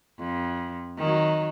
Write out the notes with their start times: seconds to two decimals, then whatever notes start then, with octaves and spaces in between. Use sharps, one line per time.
0.18 F2
0.98 D#3 F#3